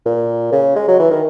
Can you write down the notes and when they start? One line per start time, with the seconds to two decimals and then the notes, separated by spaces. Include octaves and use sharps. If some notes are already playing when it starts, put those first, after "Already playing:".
0.06 A#2
0.52 C#3
0.76 G#3
0.88 F#3
0.99 E3
1.10 D#3